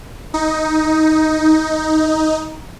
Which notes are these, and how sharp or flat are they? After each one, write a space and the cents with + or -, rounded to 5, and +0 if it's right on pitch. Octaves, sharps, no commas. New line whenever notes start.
D#4 +10